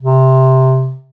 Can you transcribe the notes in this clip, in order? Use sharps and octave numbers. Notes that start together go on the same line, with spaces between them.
C3